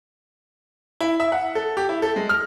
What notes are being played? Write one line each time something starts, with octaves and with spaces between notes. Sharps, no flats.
E4
E5
F#5
A4
G4
E4
A4
G#3
F6